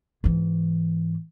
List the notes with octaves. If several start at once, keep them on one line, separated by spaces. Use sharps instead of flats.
G#2 E3